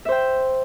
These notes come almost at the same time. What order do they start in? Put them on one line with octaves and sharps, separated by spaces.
E5 C5 G5